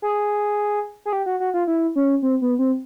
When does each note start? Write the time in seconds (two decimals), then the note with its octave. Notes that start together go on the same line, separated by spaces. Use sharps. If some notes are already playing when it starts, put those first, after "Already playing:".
0.02 G#4
1.06 G#4
1.13 G4
1.26 F#4
1.40 F#4
1.54 F4
1.67 E4
1.96 C#4
2.22 C4
2.42 B3
2.59 C4